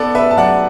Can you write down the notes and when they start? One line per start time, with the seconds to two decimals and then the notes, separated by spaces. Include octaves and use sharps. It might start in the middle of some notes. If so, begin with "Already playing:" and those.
Already playing: B3 A4 D5
0.15 B4 E5
0.31 A5
0.37 F#2 D5 F#5